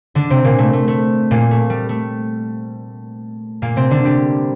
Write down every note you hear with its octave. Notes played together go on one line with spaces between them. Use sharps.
D3 D4
C3 C4
A#2 A#3
A3
A3
A3
A#2 A#3
A3
G3
A3
A#2 A#3
C3 C4
D3 D4
G3 G4